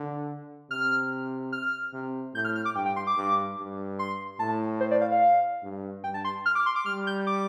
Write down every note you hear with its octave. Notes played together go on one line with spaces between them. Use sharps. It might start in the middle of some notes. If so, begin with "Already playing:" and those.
Already playing: D3
C3 F6
F6
C3
A2 G6
F6
F6
D6
G2 G5
G5
C6
D6
G2
G2
C6
A2 A5
C5
D5
F5
F5
G2
G2 G5
A5
C6
F6
D6
C6
D6
G3 F6
G6
D6